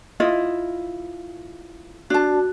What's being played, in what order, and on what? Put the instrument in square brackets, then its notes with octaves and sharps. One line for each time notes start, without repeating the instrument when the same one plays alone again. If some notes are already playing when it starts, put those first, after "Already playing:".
[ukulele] E4 F4 D#5
[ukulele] D4 A5 [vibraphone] F#4